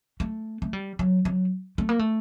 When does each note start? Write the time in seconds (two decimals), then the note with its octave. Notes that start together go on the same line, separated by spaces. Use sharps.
0.20 A3
0.62 A3
0.73 G3
0.99 F#3
1.25 F#3
1.78 A3
1.89 A#3
1.99 A3